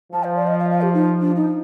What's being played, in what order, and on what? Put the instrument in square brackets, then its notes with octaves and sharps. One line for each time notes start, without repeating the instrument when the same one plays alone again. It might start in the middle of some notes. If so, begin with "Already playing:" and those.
[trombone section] F3 [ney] A5
[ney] C5
D5
D#5
F5
F5
G4
D#4
D4
D#4